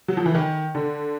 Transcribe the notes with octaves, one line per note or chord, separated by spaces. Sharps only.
F#3
F3
E3
D#3
D3